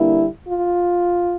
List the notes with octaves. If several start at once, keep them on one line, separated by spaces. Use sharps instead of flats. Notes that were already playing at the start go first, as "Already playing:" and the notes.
Already playing: D3 G3 A#3 D4 E4
F4